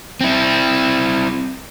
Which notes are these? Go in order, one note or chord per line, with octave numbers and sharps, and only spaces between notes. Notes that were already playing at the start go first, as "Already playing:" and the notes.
C4 E4